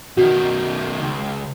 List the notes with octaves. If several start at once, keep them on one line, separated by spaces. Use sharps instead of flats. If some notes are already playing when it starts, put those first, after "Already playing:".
B2 D#3 F#4
C#2